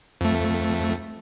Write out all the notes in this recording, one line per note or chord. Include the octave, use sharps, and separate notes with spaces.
F2 A3